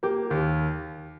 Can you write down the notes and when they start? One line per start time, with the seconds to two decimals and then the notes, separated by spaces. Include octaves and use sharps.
0.03 A#3 G4
0.30 D#2 G4